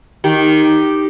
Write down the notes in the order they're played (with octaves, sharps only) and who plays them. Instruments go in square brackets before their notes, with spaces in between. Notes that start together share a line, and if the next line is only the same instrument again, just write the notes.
[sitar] D#3 [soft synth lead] G4